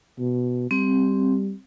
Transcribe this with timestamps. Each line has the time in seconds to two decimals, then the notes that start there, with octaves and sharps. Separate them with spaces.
0.19 B2
0.71 G3 C4